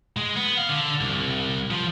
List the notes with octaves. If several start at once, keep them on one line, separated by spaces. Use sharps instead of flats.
G#3
B3
F5
D3
C2
F3